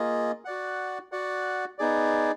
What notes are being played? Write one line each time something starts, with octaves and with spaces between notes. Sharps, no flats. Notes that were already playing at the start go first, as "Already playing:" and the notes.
Already playing: A#3 F4 G#4 D#5
F#4 D5 F#5
F#4 D5 F#5
B3 D#4 G#4 D5